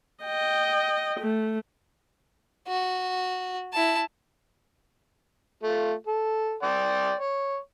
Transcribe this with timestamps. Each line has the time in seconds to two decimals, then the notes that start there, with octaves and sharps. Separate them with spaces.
0.24 D#5 G5
1.20 A3
2.67 F#4
3.73 E4 A5
5.63 A3 F4
6.07 A4
6.63 D5 G5 C6
7.19 C#5